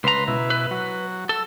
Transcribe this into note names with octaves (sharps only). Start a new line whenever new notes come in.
C#2 B4 A#5 C6
B2 E4
B4
F#3
A4 E6